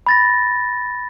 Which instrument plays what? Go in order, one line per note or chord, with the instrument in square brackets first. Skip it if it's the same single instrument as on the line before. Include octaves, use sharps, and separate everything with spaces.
[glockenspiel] B5 A6 A#6